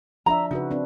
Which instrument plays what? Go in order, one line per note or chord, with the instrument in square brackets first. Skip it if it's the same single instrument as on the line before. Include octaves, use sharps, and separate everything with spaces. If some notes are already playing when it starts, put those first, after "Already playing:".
[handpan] F3 D4 E5 [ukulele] A#5
[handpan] C#3 F#4 B4 [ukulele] D#4
[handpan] C4 D4 B4